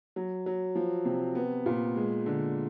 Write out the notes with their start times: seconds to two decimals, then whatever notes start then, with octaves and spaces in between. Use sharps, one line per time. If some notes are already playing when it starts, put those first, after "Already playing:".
0.16 F#3
0.46 F#3
0.75 F3
1.05 C3
1.35 B3
1.66 A#2
1.96 G#3
2.26 D3